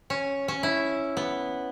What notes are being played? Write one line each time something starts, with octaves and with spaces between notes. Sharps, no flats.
C#4
C#4
E4
B3